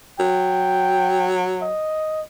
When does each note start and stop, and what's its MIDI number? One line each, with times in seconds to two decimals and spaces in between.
0.20 1.72 54
0.20 1.29 79
1.62 2.22 75